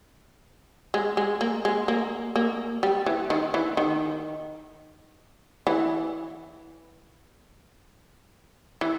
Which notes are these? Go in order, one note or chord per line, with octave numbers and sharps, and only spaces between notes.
G#3
G#3
A#3
G#3
A#3
A#3
G3
E3
D#3
E3
D#3
E3
E3